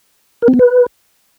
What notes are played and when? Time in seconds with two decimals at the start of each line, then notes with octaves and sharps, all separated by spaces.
0.42 A#4
0.48 C4
0.54 B3
0.59 B4